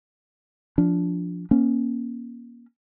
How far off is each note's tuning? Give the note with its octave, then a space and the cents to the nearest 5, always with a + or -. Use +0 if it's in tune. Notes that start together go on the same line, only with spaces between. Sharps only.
F3 +0 D4 -15
A#3 +30 C#4 +0